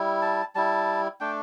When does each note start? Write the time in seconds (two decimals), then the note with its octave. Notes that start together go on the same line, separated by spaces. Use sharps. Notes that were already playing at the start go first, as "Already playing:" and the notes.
Already playing: G3 E4
0.22 A5
0.55 G3 E4 A5
1.20 A3 D4 G5